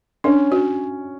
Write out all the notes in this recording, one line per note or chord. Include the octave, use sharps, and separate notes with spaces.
C#4 D4
C#4 F#4